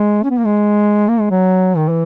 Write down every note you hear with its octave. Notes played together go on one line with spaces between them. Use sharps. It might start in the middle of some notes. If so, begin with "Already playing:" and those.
Already playing: G#3
C#4
B3
A#3
G#3
A#3
G#3
F#3
D#3
E3